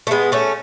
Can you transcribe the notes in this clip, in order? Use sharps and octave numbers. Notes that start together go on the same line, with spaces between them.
A3
G#3 B3
A3 C#4